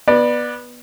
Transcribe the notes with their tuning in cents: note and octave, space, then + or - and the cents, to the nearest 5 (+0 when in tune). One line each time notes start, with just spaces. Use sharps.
B3 -15 D5 +15